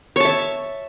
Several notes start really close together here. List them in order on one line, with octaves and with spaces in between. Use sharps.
C#5 A5 E5